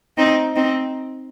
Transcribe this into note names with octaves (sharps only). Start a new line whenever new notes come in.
C4 D#4
C4 D#4